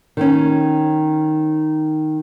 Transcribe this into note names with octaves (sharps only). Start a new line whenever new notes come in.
D#3 C#4